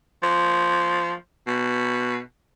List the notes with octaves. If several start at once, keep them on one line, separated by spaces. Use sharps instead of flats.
F3
B2